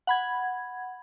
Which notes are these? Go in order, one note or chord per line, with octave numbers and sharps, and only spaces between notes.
F#5 B5 G#6